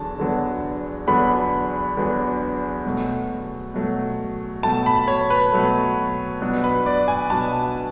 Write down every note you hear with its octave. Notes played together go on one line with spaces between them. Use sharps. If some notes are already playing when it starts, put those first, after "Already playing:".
Already playing: E2 D3 F#3 D4 A5
E2 D3 F#3 B3 D4
E2 D3 F#3 B3 D4 B5
E2 D3 F#3 B3 D4
B2 F#3 A3
B2 F#3 A3
B2 F#3 A3 A5
B5
C#5
B4
B2 F#3 A3
B2 F#3 B3 D4
B4
D5
G#5
B2 F#3 B3 D4 A5